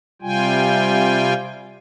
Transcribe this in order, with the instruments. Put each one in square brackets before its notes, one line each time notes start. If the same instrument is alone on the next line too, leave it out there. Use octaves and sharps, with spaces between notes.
[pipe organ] C3 G3 F4 G5 G#5